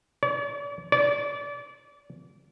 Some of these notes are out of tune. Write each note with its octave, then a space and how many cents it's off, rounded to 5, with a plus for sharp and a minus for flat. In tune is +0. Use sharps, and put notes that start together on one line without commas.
D5 -45
D5 -30